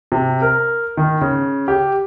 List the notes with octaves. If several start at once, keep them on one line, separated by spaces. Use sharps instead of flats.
C3
A#4
D#3
C#3
G4